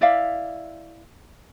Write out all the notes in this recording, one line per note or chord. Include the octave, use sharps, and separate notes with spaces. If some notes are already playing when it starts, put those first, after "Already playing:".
E4 D5 E5 F5